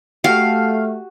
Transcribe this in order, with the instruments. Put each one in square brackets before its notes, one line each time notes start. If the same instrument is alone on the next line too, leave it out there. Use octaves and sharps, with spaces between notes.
[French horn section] A3 [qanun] F#4 G4 [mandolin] F5